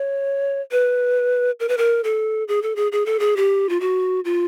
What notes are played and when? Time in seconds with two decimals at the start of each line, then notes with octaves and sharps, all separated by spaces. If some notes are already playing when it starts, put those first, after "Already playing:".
Already playing: C#5
0.71 B4
1.60 A#4
1.69 B4
1.78 A#4
2.04 A4
2.48 G#4
2.62 A4
2.76 G#4
2.92 G#4
3.06 A4
3.19 G#4
3.37 G4
3.69 F4
3.80 F#4
4.25 F4